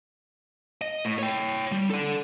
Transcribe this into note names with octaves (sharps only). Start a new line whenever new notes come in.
D#5
A2
C#5 G5
G3
A4 D5